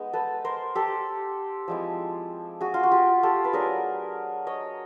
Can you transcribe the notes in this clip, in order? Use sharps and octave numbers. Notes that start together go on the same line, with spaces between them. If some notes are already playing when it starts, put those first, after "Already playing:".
Already playing: G#3 B3 D#4
A4 B4
A#4 C5
G4 A4
F3 G#3 C4 E4
F#4 G#4
F4
F#4
F4 G4
G4 A4
B4
F#3 A3 D4 G#4 A#4
C#5 D#5